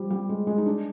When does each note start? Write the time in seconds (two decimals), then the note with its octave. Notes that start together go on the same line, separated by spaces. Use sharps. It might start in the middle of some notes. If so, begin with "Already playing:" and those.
Already playing: F3 G3
0.10 G3
0.29 G#3
0.47 G#3
0.58 D#4
0.66 D4